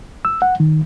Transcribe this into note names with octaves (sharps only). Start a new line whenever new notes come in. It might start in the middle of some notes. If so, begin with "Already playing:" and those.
E6
F#5
D#3